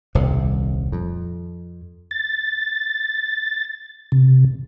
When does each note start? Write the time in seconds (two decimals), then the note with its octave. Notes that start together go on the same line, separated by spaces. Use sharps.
0.15 D#1 C2 C3
0.92 F2
2.11 A6
4.12 C3